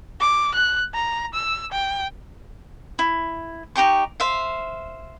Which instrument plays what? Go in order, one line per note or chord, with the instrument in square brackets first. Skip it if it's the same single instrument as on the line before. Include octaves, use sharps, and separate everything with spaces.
[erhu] D6
F#6
A#5
E6
G5
[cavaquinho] E4
D#4 G4 G5 C#6
C5 E5 F5